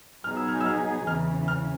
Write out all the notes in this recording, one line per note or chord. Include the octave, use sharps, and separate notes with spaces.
B2 F#3 B3 D#4 G#4 F6
E6
F6
E6
F6
E2 C#3 E3 F6
F6